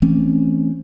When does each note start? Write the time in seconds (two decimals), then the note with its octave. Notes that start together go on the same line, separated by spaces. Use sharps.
0.02 E3 A3 C4 C#4